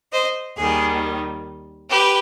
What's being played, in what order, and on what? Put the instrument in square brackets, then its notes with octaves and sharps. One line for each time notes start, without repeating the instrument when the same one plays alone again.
[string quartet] C5 D#5
D#2 D#3 G3 G#4
G4 B4